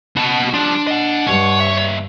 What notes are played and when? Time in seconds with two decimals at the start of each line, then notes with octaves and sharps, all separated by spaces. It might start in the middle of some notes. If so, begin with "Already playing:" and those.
0.17 B2 F#4 A5
0.54 F3 G3 D4
0.87 D#5 F#5
1.27 G2 C#5
1.60 D#2 E5